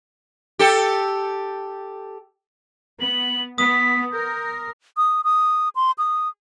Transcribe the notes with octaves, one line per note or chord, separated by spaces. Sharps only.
G4 A4
B3 F#7
B3 D#6 B6
A#4 G6
D#6
D#6
C6
D#6